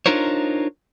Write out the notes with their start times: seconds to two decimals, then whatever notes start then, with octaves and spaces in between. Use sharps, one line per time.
0.06 D4 D#4 F4 A#4 C5 C#5